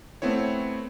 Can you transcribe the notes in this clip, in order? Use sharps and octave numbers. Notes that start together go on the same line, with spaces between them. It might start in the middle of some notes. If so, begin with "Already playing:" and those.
A3 B3 C4 E4 C#5